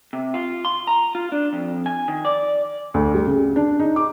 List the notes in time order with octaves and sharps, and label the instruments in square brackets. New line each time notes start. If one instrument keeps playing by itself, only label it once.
[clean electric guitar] C3
F4
C6
A#5
F4
D4
F2
G#5
D#3
D5
[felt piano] D2
G3
C#3
D4
D#4
D6